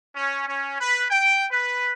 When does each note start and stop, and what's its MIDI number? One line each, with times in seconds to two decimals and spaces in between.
0.16 0.45 61
0.48 0.77 61
0.80 1.04 71
1.11 1.46 79
1.52 1.93 71